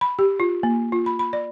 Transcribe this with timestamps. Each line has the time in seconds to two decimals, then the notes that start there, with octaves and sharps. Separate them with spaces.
0.01 B5
0.19 G4
0.40 F4
0.63 A#3
0.92 F4
1.06 B5
1.19 B5
1.33 D5